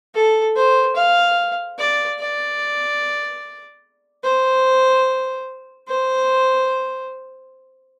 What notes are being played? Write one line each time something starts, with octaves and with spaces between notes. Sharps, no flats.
A4
C5
F5
D5
D5
C5
C5